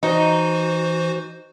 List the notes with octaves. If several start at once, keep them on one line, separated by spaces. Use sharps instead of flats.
E3 D#4 F#4 C5